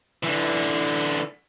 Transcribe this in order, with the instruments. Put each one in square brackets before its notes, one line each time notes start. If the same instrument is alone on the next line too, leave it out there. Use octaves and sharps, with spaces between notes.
[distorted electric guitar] D3 E3